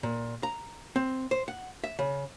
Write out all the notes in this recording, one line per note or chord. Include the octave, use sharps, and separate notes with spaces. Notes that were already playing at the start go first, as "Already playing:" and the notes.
A#2
A#5
C4
C5
F#5
E5
C#3